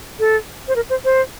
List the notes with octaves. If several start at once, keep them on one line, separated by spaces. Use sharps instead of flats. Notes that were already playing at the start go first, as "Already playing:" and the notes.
A4
C5
A#4
C5
C5